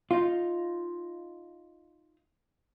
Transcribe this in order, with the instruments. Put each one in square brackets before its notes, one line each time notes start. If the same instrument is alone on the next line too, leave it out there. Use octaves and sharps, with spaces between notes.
[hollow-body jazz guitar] D#4 F4